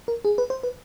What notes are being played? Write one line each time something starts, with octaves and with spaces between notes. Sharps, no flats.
A#4
G#4
B4
C5
B4